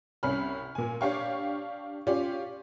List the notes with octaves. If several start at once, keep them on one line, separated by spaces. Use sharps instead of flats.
C2 C3 C#4 B5 F6
A#2 G#5
D4 G4 C#5 F5 G5 C#6
C#4 F4 G4 D5